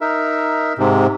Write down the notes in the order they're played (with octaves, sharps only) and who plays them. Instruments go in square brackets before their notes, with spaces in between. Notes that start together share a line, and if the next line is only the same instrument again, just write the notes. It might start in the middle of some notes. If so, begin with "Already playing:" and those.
[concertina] D#4 A#4 E5
[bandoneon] G#2 C3